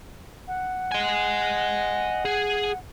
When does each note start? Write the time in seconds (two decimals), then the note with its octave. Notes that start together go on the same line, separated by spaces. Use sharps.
0.48 F#5
0.92 D#5 G#5
2.25 G#4